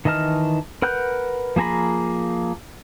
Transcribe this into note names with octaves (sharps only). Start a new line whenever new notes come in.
D#3 E3 D#5 A5 F6
A#4 B4 F#5 F#6 G6
F3 A#3 G#4 A#5 B5